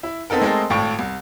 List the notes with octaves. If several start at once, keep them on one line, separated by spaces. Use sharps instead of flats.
E4
B3 C4 D#4 A4 A#4
G#3 A3 C4 A4 A#4 D#5
G#1 A2 F5 G5 A5 C#6
C2